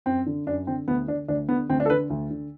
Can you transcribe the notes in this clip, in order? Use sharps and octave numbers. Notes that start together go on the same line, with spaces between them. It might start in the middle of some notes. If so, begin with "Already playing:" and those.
F#2 C4
D3
F#2 D4
D3 C4
D2 B3
D3 D4
D2 D4
D3 B3
D2 C4
D4
A4
D3 B4
D2
D3